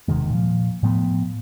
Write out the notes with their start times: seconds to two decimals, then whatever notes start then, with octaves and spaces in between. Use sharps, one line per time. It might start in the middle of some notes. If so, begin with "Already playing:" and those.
0.08 E1 C3 D#3 G#3
0.30 A#2 F3
0.83 A2 F3 A3 B3